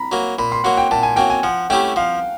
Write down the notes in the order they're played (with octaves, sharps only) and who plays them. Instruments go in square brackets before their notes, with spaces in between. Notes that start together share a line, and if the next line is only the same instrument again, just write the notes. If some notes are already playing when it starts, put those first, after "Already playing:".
Already playing: [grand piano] A#5 B5
[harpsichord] F#3 A#3
[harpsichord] A#2 [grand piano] B5
[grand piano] C6
[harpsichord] F#3 A#3 [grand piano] F#5
[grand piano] G5
[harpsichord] A#2 [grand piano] A5
[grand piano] G#5
[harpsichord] F#3 A#3 [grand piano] G5
[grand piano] G#5
[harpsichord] F3 [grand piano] F#5
[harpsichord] A3 C#4 E4 G4 [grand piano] G5
[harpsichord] F3 [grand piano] F5